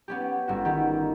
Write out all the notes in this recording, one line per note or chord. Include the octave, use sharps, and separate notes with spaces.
B3 C#4 G4
G1 F#4
D#3 G4